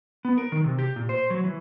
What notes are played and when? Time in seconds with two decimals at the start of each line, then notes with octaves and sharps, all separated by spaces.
0.25 B3
0.38 A#4
0.52 D#3
0.64 C3
0.79 G4
0.96 A#2
1.09 C5
1.30 F#3
1.44 E3